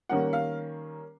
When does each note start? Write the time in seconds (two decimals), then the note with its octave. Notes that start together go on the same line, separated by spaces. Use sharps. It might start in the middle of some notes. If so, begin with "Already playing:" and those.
0.09 D#3 G3 A#3 C#4 F#5
0.33 F5